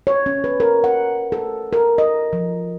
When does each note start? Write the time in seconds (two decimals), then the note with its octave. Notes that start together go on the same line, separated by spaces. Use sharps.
0.07 C#5
0.26 C#4
0.44 B4
0.60 A#4
0.84 F#5
1.32 A4
1.73 A#4
1.98 D#5
2.33 F3